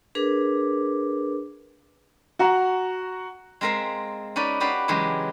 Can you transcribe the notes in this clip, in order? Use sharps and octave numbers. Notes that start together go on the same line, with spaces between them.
D4 G#4 A#4 B4 D6
F#4 F#5 A#5
G#3 C4 A#4 E5 F5
C#4 D#4 B4 D5
F#4 G4 B4 D5 F5
C#3 E3 F#3 G#3 G4